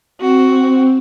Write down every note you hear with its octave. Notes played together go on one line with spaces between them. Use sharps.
C4 F#4